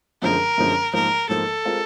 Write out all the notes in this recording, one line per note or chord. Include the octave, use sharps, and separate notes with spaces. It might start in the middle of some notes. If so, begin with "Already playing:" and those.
F#2 D3 F3 G#3 C#4 A#4
F#2 D3 F3 G#3 C#4
G#2 F3 A#3 A#4
G#2 F3 A#3 A4
G#3 C4 F4 A#4